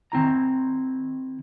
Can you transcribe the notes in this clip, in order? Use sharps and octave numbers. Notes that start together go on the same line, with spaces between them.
D#3 C4 E4 A#5